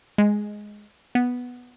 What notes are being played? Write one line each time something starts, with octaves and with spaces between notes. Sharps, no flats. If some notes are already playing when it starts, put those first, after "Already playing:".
G#3
B3